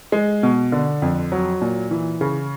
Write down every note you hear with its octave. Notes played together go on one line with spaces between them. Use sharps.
G#3
B2
D3
F2
F#3
A#2
E3
C#3